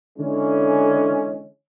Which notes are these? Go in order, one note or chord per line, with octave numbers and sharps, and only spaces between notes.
D3 E3 G#3 C#4